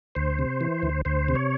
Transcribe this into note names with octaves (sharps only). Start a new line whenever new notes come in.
D2 C5
C3
E3
D2
D2 C5
C3
C#5